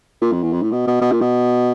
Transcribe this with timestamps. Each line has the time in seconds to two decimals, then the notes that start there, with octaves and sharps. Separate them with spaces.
0.22 A#2
0.32 F2
0.43 E2
0.53 F2
0.62 A2
0.72 B2
0.88 B2
1.02 B2
1.12 A#2
1.21 B2